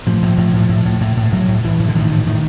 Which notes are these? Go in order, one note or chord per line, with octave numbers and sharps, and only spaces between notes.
A2 F3
A2
A2
A2
A2
A2
A2
A2
A2 F#3
A2
A2 E3
A2
D3
A2 D#3
A2
A2 D#3